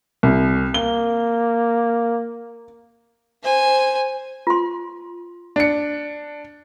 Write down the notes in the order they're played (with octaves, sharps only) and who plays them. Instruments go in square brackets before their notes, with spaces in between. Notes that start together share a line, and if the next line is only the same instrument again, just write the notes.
[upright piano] C2
[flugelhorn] A#3 [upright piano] G7
[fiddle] C5 G#5
[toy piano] F4 C6
[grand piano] D4 C#7